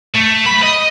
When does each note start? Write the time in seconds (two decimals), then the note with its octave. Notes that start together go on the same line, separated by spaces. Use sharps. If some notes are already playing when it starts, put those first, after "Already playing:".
0.15 A3
0.45 B1 B5
0.63 D#5